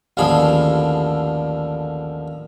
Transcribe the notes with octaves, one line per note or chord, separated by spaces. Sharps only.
A1 D#2 D3 F3 G#4 B5